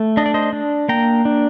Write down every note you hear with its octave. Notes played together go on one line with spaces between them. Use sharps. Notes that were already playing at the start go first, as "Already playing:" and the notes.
Already playing: A3
D4 D#5
D5
C5 D#5
D4
A#3 G5 A#5
D4